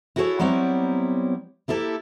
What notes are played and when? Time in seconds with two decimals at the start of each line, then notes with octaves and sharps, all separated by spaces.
0.16 E4 F#4 G#4 A4 C5 C#5
0.39 F#3 G3 B3 C4 E4 C#5
1.68 A#3 E4 G4 A4